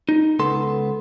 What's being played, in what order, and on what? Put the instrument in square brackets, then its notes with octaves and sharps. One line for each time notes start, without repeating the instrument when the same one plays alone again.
[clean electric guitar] D#4
C#2 B3 A4 C6